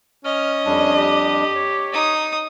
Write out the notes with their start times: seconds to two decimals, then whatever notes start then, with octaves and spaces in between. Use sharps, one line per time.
0.25 C#4 D#5 F6
0.66 F2 G3 D4
0.97 G4
1.55 C#5
1.92 D#4 D#6